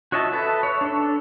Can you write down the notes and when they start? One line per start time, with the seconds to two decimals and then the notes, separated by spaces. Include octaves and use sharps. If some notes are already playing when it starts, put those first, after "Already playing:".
0.12 F#4 C#5 D#5 E5 A5
0.33 A4 B4 E5
0.63 C#5
0.81 D4 A4